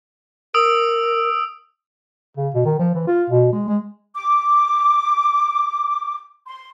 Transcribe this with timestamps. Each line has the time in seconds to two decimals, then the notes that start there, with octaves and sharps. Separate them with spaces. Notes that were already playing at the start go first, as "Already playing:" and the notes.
0.54 A#4 D#6 E6 D7
2.37 C#3
2.54 B2
2.66 D#3
2.79 F3
2.95 E3
3.07 F4
3.30 B2
3.53 G#3
3.68 G#3
4.15 D6
6.48 C6